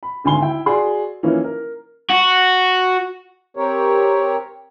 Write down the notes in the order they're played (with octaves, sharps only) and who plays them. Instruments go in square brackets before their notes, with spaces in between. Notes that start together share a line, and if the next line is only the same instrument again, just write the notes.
[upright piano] B5
G#1 D2 G#2 G#5 C6 G7
E4 G5
F#4 G#4 D5 C6
E3 F3 A#3 C#4 D#4 E4
A#4
[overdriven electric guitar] F#4
[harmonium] C4 G4 A#4 C#5